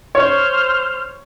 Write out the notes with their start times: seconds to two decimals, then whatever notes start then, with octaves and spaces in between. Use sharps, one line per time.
0.15 C5 C#5 F6